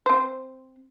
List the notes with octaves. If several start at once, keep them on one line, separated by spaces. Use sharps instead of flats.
C4 C5